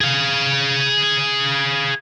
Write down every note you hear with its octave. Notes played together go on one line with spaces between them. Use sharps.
G#4 F5